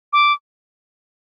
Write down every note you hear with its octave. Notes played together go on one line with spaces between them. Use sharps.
D6